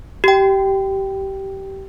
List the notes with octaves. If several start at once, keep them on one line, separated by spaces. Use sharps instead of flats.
G4 G5